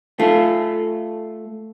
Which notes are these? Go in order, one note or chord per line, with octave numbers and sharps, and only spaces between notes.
A3 F4